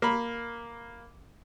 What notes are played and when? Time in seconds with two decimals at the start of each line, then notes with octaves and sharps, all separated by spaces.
0.02 A#3 B5